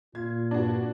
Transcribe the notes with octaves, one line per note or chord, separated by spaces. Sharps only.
A#2 F4 G#6
G2 D4 F#4